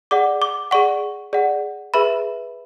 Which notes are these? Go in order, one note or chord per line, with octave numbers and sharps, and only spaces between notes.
G#4 D5 F#5 D6
D6
G#4 D5 F#5 C#6
G#4 D5 F#5
G#4 B4 E5 B5